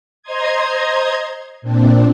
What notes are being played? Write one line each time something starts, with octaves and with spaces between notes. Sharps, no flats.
C5 D#5 A#5 C6 D#6 G#6
A#2 C4 D4